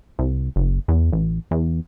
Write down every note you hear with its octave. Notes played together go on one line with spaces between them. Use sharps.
C2
F#1
E2
A1
E2